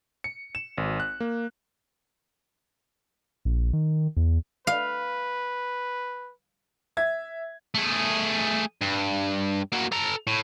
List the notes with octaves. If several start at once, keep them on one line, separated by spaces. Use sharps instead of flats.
C#7
E7
G#1
F#6
A#3
A#1
D#3
E2
B4 F5
E5 G#6
A3 G#4
G2
A#3 F#4
A4 A#5
A2